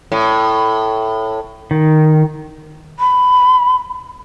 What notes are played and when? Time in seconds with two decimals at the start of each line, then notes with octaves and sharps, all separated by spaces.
0.12 A2
1.71 D#3
2.99 B5